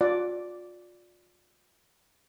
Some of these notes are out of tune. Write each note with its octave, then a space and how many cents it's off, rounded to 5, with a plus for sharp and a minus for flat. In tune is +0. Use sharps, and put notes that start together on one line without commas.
F4 +35 D5 +0